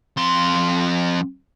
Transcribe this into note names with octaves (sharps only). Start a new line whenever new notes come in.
F2 C6